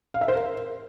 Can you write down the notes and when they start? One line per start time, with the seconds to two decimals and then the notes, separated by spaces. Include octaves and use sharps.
0.14 F5
0.21 E5
0.28 C5
0.35 A#4